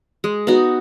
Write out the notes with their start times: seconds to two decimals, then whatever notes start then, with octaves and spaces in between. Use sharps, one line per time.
0.24 G#3
0.47 B3 D#4 F#4